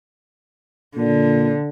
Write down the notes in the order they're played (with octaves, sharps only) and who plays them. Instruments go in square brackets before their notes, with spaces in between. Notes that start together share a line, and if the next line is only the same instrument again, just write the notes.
[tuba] A#2 [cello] D3